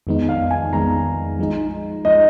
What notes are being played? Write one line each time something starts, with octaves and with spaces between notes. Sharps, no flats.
F2 D#3 G#3 B3 D#4
F5
G#5
F2 D#3 G#3 B3 D#4 A#5
F3 G#3 D#4
F3 G#3 D#4 D#5